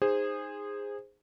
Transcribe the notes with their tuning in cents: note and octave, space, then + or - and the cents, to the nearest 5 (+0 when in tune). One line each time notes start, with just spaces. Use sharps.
D#4 +0 G#4 -20 C5 +0